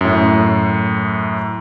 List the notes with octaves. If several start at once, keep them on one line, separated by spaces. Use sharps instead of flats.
F#2 A2